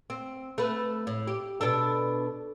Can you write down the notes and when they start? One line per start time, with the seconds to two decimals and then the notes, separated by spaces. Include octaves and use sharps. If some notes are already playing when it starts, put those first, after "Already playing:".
0.10 C4
0.58 A3 B4
1.07 A2
1.27 G4
1.61 B2 D4 A4